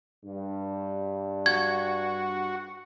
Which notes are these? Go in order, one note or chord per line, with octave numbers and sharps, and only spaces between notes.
G2
F#4 G#6